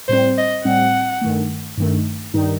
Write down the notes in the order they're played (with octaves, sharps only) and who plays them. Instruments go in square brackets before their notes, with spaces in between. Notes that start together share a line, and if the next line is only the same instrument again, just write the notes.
[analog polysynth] A2 G3 C4 [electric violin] C5
[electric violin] D#5
[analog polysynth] A2 G3 C4 [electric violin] F#5
[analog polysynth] G2 D#3 A3
G2 D#3 A3
G2 D#3 G3 D#4